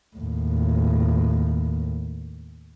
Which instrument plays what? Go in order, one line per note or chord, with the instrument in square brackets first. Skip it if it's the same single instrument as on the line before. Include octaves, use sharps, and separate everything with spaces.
[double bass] D#2 A2